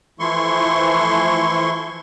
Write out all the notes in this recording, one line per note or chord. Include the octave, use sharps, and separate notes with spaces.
E3 F3 A3 E4 C6 C#6